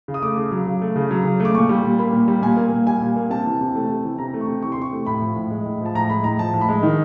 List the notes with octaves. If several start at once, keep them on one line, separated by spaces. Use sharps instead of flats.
C#3
D#6
A3 D6
C#3
F#3
C#3
A3
C#3
F#3
C#3
A3
D6
A#2 C#6
G3
A#2
A#3 B5
A#2
G3
A#2 G#5
A#3
A#2
G3 G#5
A#2
A#3
C3 A5
E3
C3
A3
C3
E3
C3 A#5
A3
C#6
C3
E3 C#6
C6
C3 C#6
A3
A2 B5
F3
A2
G#3
A2
F3
A5
A2 A#5
G#3 B5
A2 A#5
F3 A5
A2
B5
G#3
D#3